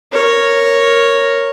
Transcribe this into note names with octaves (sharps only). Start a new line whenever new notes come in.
A#4 C#5